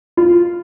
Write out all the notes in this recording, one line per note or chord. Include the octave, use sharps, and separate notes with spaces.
F4